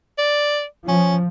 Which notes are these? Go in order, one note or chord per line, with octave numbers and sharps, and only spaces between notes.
D5
F3 C#4